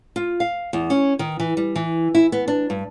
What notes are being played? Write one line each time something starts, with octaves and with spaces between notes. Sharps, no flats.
F4
F5
E2
C#4
D#3
E3
G3
E3
E4
B3
D4
G2